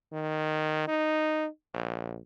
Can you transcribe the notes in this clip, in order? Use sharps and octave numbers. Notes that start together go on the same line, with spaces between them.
D#3
D#4
A#1